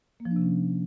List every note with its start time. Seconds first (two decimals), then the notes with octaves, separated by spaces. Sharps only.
0.20 A#3
0.25 F3
0.31 D4
0.36 C3
0.42 C#4